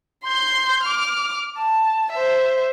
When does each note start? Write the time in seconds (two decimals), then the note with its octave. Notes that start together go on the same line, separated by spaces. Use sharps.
0.24 C6 G6
0.84 D6 F6
1.58 A5
2.12 C5 E5